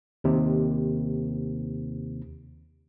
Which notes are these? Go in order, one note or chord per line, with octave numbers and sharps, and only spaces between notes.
D#2 C3